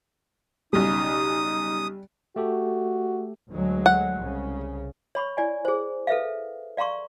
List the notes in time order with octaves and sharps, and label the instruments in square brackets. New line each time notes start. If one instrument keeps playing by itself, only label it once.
[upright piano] B1 C#3 [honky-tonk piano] G3 [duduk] D#4 [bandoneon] D#6
[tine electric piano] A3 G4 A4 [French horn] F#4
[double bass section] D2 F#3 G#3
[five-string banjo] F#5
[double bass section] C2 C#3
[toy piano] C#5 B5 C#6
E4 D5 G#5
G#4 C5
A4 B4 E5 F5
D5 F5 A#5 C6 C#6